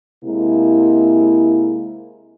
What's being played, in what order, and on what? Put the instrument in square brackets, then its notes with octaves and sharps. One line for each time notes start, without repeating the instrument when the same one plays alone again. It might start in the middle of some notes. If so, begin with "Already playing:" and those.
[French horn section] C3 G#3 A#3 E4